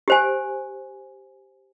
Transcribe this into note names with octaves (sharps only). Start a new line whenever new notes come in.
G4 C5 G#5